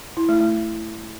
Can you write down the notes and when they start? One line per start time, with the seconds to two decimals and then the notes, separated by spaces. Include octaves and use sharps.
0.17 E4
0.29 A3
0.41 A3